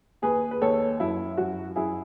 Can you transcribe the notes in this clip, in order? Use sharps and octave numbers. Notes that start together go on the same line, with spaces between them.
D#2 G#4 B4
B4
D#2 A4 C#5
F#2 E4
F#2 F#4
F#2 E4 G#4